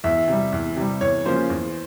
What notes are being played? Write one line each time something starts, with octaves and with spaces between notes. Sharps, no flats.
E2 E5
C3 G3
E2
C3 G3
E2 C#5
C#3 F3 A#3 C#4 C5
E2